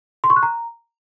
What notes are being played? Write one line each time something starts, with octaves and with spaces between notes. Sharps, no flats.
C6
C#6
F#6
A#5